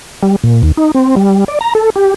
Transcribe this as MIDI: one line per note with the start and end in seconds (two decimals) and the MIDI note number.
0.23 0.36 55
0.44 0.62 46
0.63 0.72 39
0.77 0.91 63
0.95 1.15 60
1.16 1.45 55
1.48 1.59 74
1.61 1.74 82
1.75 1.90 69
1.96 2.14 67